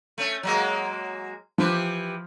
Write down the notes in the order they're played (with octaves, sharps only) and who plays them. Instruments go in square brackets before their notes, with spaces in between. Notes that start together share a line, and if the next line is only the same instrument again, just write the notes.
[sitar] A3 C#4
F#3 G#3 A#3
[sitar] E3 G4 B4 [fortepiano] F3